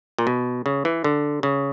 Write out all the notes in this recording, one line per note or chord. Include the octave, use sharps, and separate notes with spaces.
A#2
B2
C#3
E3
D3
C#3